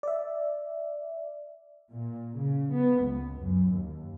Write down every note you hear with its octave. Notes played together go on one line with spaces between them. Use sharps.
D5 E5
A#2
C#3
B3
C#2
F#2
D#2